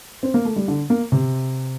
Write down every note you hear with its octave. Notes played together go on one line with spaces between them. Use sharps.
C4
A#3
A3
G3
D3
A#3
C3